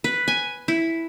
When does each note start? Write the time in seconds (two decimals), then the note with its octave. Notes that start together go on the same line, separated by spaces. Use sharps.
0.04 B4
0.28 G#5
0.68 E4